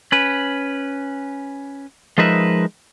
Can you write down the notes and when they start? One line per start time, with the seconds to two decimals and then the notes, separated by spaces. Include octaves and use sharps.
0.12 C#4 B4
2.18 F3 G#3 D#4 A#4 B4 E5